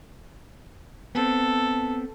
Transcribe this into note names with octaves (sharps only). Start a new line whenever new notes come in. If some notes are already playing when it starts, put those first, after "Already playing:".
B3 C4 A4